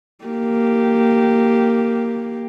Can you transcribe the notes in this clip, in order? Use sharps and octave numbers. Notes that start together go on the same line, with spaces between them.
A#3 G4